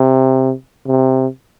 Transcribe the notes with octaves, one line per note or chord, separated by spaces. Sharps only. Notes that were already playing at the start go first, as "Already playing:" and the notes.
Already playing: C3
C3